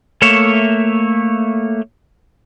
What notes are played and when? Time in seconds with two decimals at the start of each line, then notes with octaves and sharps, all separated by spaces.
0.22 A3 A#3 C#5 E5